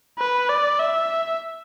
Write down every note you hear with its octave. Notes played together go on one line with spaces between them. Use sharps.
B4
D5
E5